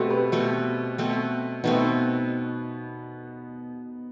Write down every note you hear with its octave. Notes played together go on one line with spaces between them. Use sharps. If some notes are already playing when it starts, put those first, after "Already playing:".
Already playing: B2 A3 C4 F#4 G4 A4 B4
G4 B4
B2 A3 C4
B2 A3 C4
B2 A3 B3 C4 D#4